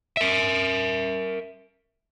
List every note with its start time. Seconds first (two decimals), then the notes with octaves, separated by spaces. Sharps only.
0.17 A#4 E5